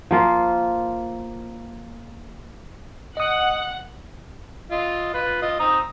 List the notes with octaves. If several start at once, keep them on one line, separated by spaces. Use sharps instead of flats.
F3 A#3 F4
D#5 F#5 D#6
F4 D#5
F4 B4
F4 D#5
C4 A#5 D#6